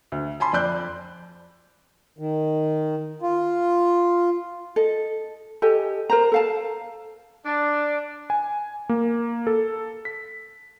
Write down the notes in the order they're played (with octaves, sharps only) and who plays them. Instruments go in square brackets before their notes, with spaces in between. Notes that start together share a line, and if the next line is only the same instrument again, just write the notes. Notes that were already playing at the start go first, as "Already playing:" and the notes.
[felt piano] D2
G#5 A5 B5 C6
F2 D5 F#6 G6
[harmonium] D#3
F4
[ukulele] A4 D#5
G4 A4 D#5 G#5
A#4 C5 A#5
A4 F5 A5
[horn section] D4
[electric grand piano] G#5
A#3
A4
B6